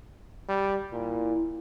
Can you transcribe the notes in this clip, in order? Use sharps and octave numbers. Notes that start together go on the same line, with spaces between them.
G3
A#2 E4